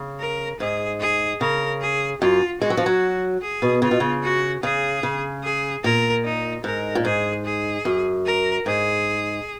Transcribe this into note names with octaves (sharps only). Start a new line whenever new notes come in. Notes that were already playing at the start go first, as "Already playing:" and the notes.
Already playing: C#3
A#4
G#2 G#4
G#4
C#3 A#4
G#4
F#2 F4
G#3 F#4
F#3
F3
F#3
G#4
B2
C#3 F4
B2
C#3
F#4
C#3 G#4
C#3
G#4
A#2 A#4
D#4
G#2 A#4
A#2
G#2 G#4
G#4
F#2
A#4
G#2 G#4